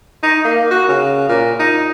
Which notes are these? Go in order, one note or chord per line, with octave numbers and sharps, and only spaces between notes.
D#4
A#3
F#4
C#3
A#2
D#4